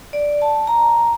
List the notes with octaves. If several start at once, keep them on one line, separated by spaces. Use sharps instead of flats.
D5
A5
A#5